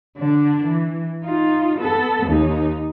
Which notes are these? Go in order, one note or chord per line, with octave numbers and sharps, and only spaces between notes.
D3 D4
E3
D#4 F4
B3 A4
D#2 D#4